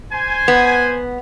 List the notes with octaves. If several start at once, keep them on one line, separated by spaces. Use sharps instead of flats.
C5 G#5
B3